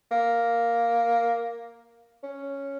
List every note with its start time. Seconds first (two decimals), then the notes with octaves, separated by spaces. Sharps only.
0.11 A#3
2.23 C#4